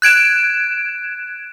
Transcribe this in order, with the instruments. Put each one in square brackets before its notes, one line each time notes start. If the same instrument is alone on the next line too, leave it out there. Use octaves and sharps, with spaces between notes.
[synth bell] F#6 G#6 D7 E7